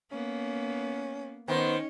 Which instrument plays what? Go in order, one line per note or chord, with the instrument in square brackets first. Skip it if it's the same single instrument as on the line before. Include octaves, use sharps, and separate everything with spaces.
[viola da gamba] A#3 B3 [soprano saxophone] C#4
[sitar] D#3 [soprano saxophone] B3 [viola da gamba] C#4 C#5 [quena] C5